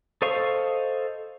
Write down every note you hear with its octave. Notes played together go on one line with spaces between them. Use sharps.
A4 C5 D#5 F5 C#6